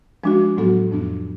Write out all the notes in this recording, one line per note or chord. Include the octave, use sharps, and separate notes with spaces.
F3 G#3 D4 F#4
A2 F#3 B3 F#4 A4
F2 F3 B3 D4